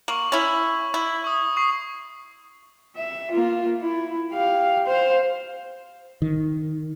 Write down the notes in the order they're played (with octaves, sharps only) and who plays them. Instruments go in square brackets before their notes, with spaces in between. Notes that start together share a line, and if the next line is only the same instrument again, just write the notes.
[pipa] A#3 [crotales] C#6 F#7
[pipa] C#4 E4
E4
[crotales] C#6 D#6
C#6 D#6 C7
[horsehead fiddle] E5
A#3 F4
E4
G4 F5
C5 F5
[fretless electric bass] D#3